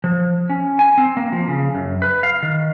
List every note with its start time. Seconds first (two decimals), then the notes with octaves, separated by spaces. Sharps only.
0.04 F3
0.50 C#4
0.79 G#5
0.98 C4
1.17 A#3
1.32 F3
1.48 C#3
1.75 F#2
2.02 B4
2.23 F5
2.43 D#3